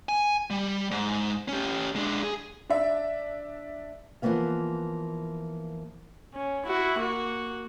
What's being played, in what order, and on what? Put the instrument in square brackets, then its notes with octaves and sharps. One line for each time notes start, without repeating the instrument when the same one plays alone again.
[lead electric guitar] G#5
G3
G#2
C#4 G4
G#3 D4
G#4
[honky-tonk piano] D4 E5
[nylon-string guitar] E3 F3 G#3 A#3 B3 F5
[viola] C#4
E4 F#4
A#3 F#4